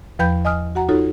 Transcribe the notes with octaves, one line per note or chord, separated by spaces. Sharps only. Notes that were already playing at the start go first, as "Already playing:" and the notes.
E2 F3 B4 G5 B5 G6
D#5 G#5 D#6 F6
F#4 F#5 A#5
D#4 F4 F#4 A4 C#5